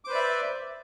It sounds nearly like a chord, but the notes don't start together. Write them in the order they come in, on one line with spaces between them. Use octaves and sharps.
D6 C5 B4 D5 E5